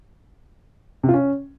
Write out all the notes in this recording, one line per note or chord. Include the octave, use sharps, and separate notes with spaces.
C3
F4
C#4